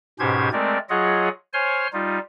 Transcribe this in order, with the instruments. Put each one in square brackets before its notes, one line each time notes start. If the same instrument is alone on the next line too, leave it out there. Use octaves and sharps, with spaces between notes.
[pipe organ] G#2 B2 C#4 G4 C5 G#6
G#3 A3 C4 A#4 D5
F#3 F4 G#4 C#5 D#5 F#5
C5 C#5 G#5 C6 F6
G3 D#4 F4